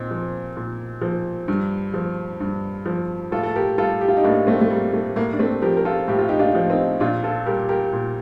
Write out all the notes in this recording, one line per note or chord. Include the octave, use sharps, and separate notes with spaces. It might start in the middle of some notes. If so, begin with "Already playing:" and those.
Already playing: A#2 C4 D#4
F3
A#2
F3
G2
F3
G2
F3
A2 F4 A4
A4
G4 A#4
G3 F4 A4
G4
F4
D#4 G4
A2 A#3 D4
A3 C4
A3
G3 A#3
A3
A2 A#3
D4
A3 C4
F3 G4 A#4
A#4
F4 A4
A2 G4
F4
D#4 G4
D4 F4
F3
C4 D#4
A#2 D4 F4
F4 A4
G3 G4 A#4
G4 A#4
A#2